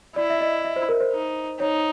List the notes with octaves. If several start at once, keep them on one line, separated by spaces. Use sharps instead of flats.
E4 D5
E5
D#5
E5
C5
A#4
C5
D#4
D#4 C#5